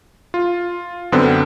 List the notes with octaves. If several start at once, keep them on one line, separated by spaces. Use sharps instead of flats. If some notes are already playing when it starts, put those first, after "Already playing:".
F4
F#2 D3 B3 C4